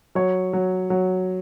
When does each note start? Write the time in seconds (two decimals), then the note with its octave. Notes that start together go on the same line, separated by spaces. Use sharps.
0.15 F#3 C#5
0.53 F#3
0.90 F#3